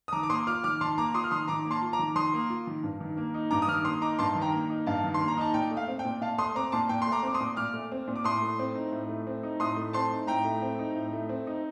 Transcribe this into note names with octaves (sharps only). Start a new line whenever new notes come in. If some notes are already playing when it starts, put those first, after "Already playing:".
D#6
D#3 A#5 D6
D6
A#3 C6 D#6
F4 D6 F6
D#3 D6 F6
D#3 A5 C6
A#3 A#5 D6
F4 C6 D#6
F6
D#3 C6 D#6
D#3 A#5 D6
A#3
A5 C6
F4
A#5 D6
D#3
D#3 C6 D#6
A#3
F4
D#3
G2
D#3
A#3
D#4
G2 A#5 D6
D#6
D#3 D6 F6
A#3 C6 D#6
D#4 A#5 D6
G2 A5 C6
D#3
G5 A#5
A#3
D#4
G2 F5 A5
D#3
C6
A#3
A#5
D#4 A5
A#2 G5
A3
F5
C4
G5
A#2
A#2 F5 A5
A3 C6 D#6
C4 A#5 D6
A#2 A5 C6
A#2 G5
C6
A3
A#5 D6
C4 D6
C6 D#6
A#2
A#2 D6 F6
A3
C4
A#2
D6
A2 C6 D#6
A3
C4
D#4
A2
A3
C4
D#4
A2 C6 D#6
A3
C4 A5 C6
D#4
A2 G5 A#5
A3
C4
D#4
A2
A3
C4
D#4